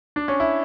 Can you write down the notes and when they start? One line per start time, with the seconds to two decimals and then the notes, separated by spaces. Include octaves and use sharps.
0.16 D4
0.28 C#4
0.40 E4